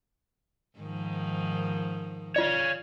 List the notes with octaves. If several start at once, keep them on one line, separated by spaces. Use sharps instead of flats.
G#2 D#3 F3
F4 C#5 D5 F5